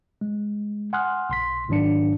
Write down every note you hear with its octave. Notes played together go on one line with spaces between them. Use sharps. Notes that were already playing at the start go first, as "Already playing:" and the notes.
G#3
F#5 G#5 C6 D#6 F6 F#6
B1 C6 B6
G#1 G#2 D#3 F#3 D4 C#7